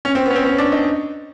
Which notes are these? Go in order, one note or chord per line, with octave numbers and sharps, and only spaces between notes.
C#4
C4
B3
C#4
C4
C#4
D4
D#4